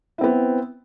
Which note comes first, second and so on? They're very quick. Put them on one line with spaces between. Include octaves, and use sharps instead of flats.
E4 C4 B3